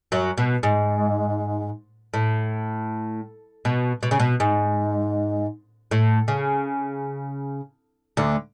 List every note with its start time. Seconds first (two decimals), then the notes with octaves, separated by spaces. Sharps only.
0.12 F#2 F#3
0.38 B2
0.63 G#2
2.14 A2
3.65 B2
4.03 B2
4.11 C#3
4.20 B2
4.40 G#2
5.91 A2
6.28 C#3
8.17 D2 D3